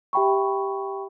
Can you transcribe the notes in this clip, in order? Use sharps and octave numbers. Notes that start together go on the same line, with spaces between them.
G4 E5 G5 B5 C#6